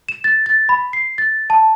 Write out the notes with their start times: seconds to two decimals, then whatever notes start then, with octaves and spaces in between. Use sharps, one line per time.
0.09 E7
0.24 A6
0.46 A6
0.69 B5
0.93 C7
1.18 A6
1.50 A5